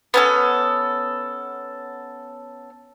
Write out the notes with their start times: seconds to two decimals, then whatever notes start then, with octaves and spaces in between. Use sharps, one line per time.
0.14 B3 C#4 A4